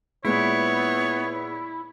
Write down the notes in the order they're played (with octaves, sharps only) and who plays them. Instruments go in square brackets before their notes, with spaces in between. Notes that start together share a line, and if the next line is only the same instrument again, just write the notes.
[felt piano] A#2 G#3 [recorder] B3 [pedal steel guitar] E4 [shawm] C#5